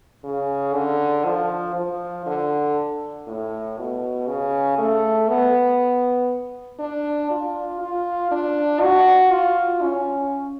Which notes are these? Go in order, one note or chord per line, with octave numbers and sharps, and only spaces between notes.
C#3
D3
F3
F3
D3
A2
B2
C#3
A3
B3
D4
F4
F4
D4
F#4
F4
C#4